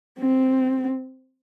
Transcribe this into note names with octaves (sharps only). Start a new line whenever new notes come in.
C4